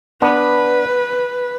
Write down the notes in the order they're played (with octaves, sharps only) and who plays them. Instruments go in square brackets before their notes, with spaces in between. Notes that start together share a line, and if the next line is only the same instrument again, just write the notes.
[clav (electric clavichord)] B3 D4 [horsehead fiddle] B4